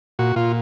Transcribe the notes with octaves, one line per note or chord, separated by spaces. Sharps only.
A#2 F#4
A#2 F4